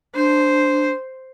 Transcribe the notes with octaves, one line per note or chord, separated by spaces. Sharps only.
D4 C5